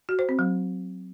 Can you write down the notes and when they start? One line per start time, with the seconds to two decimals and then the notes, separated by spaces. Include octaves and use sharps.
0.09 F#4
0.19 C5
0.29 C4
0.39 F#3